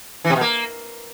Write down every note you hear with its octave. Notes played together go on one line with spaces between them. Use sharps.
E3
C3
B2
A#3